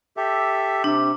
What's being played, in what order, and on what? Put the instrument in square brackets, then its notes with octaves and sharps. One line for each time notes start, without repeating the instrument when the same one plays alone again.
[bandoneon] G4 A4 E5
[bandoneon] C3 [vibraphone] D4